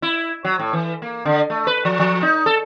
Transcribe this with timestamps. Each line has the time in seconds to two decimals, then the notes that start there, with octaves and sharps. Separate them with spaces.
0.02 E4
0.45 F#3
0.60 A2
0.73 E3
1.02 A#3
1.25 D3
1.50 A3
1.67 B4
1.85 F3
2.00 F3
2.22 D#4
2.46 A4